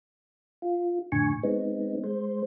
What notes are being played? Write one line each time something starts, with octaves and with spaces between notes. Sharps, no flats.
F4
F2 A2 D3 G#5 C#6
G#3 B3 C4 D#4
G#3 C5